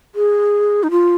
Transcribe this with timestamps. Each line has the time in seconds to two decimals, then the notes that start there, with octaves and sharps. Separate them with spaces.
0.15 G#4
0.83 D#4
0.91 F4